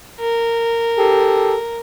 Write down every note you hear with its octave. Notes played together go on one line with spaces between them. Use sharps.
A#4
G4 A4